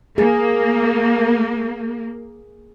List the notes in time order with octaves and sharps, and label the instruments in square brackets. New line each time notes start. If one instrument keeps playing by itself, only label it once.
[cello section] A#3 [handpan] G#4